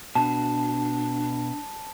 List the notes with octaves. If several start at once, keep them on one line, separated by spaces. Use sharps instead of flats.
B2 D4 A5